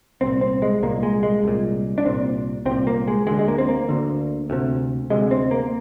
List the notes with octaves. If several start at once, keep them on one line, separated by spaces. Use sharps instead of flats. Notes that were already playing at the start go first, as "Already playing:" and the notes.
C2 A#2 C4
C4
G#3
C2 A#2 A#3
G#3
G#3
C2 A#2
D4
C2 A#2 C4
C2 C4
A#2
A#3
G#3
D2 D3 G#3
G#3
A#3
C4
A#3
D2 D3
D2 C3
D2 C3 G#3
C4
A#3